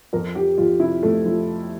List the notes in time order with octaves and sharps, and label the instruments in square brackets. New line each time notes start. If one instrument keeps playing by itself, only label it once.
[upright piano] F2 A#4
F3 G4
F2 F4
C3 E4
F2 A3
F3